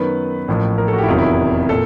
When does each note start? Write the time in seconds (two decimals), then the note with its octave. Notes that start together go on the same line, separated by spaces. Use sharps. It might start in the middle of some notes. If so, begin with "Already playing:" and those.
Already playing: F#2 D#3 F#3 B3 B4
0.48 A1 A2 F3 A#3
0.78 A#4
0.88 A4
0.93 F#4
0.98 G4
1.03 E4
1.08 F1 E2 C3 D#3 F#3 F4
1.18 E4
1.69 A#2 A4